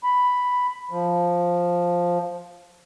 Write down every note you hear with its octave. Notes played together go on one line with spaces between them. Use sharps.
B5
F3